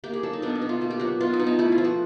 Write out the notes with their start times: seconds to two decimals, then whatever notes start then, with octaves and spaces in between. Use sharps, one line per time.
0.04 A#3 G4
0.13 G#4
0.23 F#3 A4
0.33 D#4
0.42 B2 D4
0.55 D#4
0.62 B2
0.69 F4
0.81 A#3 F#4
0.90 G4
1.00 F#3 F#4
1.20 B2 F4
1.33 D#4
1.39 B2
1.47 D#4
1.59 A3 E4
1.72 F4
1.78 F3
1.85 F#4